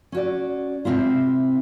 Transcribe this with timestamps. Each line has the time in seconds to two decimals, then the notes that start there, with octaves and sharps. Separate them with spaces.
0.12 C#4 F#4 D5
0.85 C3 C4 E4 F4